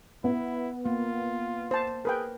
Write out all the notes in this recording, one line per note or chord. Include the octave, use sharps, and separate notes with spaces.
B3 E4
A#3 F4
C5 A5
G#4 A#4 B4 G5